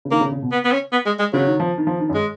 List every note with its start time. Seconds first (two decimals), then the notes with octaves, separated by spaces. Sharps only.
0.05 C#3
0.11 D#3 A#3
0.21 C#3
0.32 C#3
0.42 B2
0.52 B3
0.65 B3
0.72 C#4
0.92 B3
1.06 G#3
1.19 G#3
1.33 C#3 F#3
1.47 D#3
1.60 F3
1.78 D#3
1.87 F3
2.00 D#3
2.10 F#2
2.14 G#3